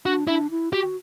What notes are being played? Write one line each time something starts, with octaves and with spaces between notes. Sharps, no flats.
D4 F#4
D4 E4
E4
F#4 G4